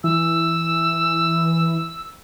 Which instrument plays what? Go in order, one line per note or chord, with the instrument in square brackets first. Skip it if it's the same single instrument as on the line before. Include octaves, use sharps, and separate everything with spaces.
[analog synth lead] E3 [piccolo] E6